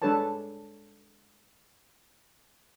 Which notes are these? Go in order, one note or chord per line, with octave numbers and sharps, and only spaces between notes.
G#3 D4 A4 B4 C#5 A5